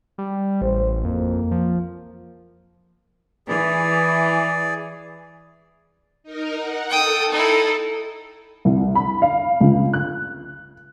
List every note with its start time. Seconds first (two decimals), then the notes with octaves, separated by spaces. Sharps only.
0.18 G3
0.61 A1 C5
1.04 F2 A#3
1.51 F3
3.48 E3 G#4 D5
6.23 D#4 A#4
6.58 F#5
6.90 A4 G5 D#6
7.32 D#4 E4
8.65 C2
8.95 B5
9.22 F5
9.61 C#2
9.93 F#6